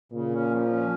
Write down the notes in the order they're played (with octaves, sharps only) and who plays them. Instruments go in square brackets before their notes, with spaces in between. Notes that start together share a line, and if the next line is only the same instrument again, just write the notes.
[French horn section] A#2 [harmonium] C#3
[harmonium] C#4
F3
C#4